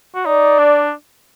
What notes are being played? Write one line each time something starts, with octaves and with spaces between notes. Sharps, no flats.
F#4
D#4 D5
D4